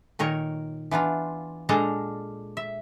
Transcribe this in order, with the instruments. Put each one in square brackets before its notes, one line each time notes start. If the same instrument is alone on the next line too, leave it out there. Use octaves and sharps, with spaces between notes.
[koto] A#2 D#3 A#4 C#5
E3 B3 D4 F4
A#2 G#3 D4 A4 F5 A#5
E5